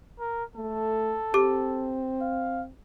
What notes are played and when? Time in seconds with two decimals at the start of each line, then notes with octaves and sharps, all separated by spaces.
0.20 A#4
0.56 A3 A4
1.34 C4 G4 D6
2.21 F5